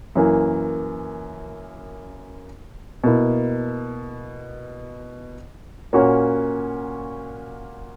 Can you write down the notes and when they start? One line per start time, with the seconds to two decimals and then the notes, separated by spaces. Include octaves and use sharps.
0.15 F#2 E3 A#3
3.04 B2 A#3 E4
5.93 A#2 A#3 C#4 F#4 C#5